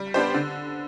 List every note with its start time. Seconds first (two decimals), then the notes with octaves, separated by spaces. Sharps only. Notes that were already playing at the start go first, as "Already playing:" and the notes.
Already playing: G3
0.14 B3 D4 G4 C5
0.34 D3